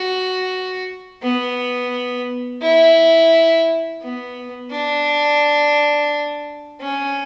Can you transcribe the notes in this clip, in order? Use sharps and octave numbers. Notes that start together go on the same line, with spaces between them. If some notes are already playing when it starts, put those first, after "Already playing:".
Already playing: F#4
B3
E4
B3
D4
C#4